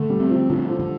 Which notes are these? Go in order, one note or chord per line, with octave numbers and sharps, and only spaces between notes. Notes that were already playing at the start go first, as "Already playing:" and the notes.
Already playing: D3 A3
G3
C4
F3
D3 F3
F3
D3